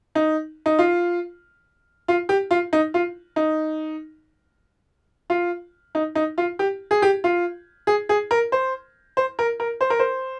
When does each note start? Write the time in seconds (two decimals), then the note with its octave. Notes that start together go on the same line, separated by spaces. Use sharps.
0.15 D#4
0.66 D#4
0.79 F4
2.08 F4
2.29 G4
2.51 F4
2.73 D#4
2.94 F4
3.36 D#4
5.30 F4
5.95 D#4
6.15 D#4
6.38 F4
6.59 G4
6.91 G#4
7.02 G4
7.24 F4
7.87 G#4
8.09 G#4
8.31 A#4
8.52 C5
9.17 C5
9.39 A#4
9.60 A#4
9.81 C5
9.90 A#4
9.99 C5